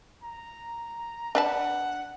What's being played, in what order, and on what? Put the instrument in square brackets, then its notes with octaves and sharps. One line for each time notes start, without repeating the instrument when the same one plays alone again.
[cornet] A#5
[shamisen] D4 B4 A5 [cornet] F#5